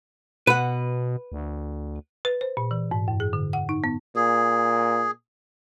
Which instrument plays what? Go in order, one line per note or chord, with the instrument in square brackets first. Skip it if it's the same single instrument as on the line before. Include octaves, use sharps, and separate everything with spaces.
[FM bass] B2 [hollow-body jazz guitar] B4 F#5
[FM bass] D2
[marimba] B4
C5
A#2
E3
G#2
F#2
G#4
D3
F#5
D#4
B3
[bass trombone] A#2 [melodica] G#4